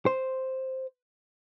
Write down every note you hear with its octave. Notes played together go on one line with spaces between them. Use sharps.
C5